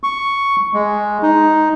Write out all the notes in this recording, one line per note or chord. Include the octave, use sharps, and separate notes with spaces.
C#6
G#3
D#4